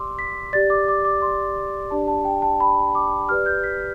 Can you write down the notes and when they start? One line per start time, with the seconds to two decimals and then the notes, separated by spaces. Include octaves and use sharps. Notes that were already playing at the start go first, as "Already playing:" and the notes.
Already playing: G4 D5 C6 D6 E6
0.19 B6
0.53 G4 D5 A6
0.70 D6
0.88 D6
1.05 D6
1.22 C6
1.90 D4 G4 D5 A5
2.08 A5
2.25 G5
2.42 A5
2.60 B5
2.95 D6
3.29 G4 B4 D5 F6
3.46 G6
3.64 B6